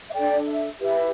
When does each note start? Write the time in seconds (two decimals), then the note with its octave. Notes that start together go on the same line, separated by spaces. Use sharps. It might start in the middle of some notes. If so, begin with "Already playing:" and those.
0.09 E5
0.13 D4 A4 D5 G5
0.47 E5
0.81 E4 G4 B4 E5